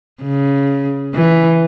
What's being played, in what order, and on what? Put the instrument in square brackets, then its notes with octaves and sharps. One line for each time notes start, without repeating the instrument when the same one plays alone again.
[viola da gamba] C#3
E3